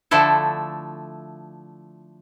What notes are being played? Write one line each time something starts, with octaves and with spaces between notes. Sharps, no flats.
D3 F3 A3 E4 A4